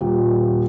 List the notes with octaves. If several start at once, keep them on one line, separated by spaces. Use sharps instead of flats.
D#1